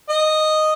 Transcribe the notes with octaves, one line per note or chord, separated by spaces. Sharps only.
D#5